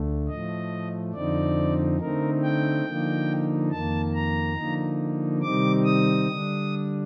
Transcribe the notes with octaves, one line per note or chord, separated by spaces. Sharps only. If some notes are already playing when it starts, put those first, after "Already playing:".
Already playing: D2 D3 A3
A2 F3 A3 D#5
F2 D3 F3 C4 D#4 D5
D3 A3 C4 D#4 A#4
G5
D3 F3 A#3 D#4
F2 D#3 A#3 A5
A#5
D3 F3 A#3 D#4
C3 D#3 G3 C4 D#4 D6
D#6
D3 G3 D4